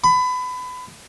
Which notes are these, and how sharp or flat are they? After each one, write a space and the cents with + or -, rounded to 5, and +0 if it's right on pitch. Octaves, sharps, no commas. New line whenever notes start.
B5 +25